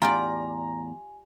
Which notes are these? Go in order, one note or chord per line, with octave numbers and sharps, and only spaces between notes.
E2 A2 F4 G4 D5 G#5 A#5